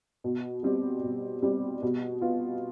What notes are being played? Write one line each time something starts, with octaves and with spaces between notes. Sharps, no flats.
B2
G3 C4 G4
B2
G3 C4 G4
B2
B3 F4